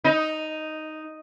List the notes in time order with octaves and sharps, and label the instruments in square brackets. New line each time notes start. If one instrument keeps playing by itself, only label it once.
[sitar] D#4